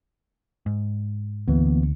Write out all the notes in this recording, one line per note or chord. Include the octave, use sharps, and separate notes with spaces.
G#2
D2 E3 A#3 B3